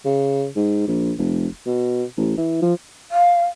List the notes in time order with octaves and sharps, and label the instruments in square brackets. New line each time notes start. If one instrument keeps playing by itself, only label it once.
[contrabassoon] C#3
G#2
A#1
F1
B2
A1
E3
F3
[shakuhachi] F5